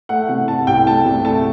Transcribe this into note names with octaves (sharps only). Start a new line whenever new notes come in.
A3 F#5
C3 F#5
A3 A5
C2 G5
A3 A5
C3
A3 A5